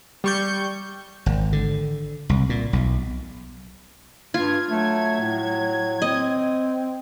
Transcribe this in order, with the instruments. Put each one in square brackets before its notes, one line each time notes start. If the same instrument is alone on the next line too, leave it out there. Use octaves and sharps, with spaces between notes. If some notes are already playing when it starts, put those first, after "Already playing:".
[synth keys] G3 C#6 G6
[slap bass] G#1
D3
C2
A#2
B1
[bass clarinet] G2 [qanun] F4 [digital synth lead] G#6
[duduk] F#3 [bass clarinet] A3
[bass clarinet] A2
[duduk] C4 [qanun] D#5